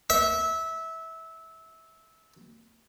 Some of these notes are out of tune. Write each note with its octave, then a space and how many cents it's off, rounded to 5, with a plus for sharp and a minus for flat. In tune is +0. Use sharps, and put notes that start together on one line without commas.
E5 -20